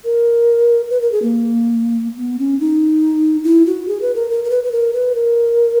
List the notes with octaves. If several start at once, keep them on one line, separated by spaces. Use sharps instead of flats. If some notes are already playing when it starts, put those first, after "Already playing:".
A#4
B4
A#4
G#4
A#3
B3
C#4
D#4
E4
F#4
G#4
B4
A#4
A#4
A#4
B4
B4
A#4
B4
A#4